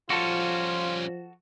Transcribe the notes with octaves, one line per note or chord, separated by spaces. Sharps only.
F3 G3 C#4 F4 F#4 A4